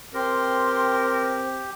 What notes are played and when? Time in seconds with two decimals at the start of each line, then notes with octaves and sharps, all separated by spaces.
0.14 C4 G4 A#4 C6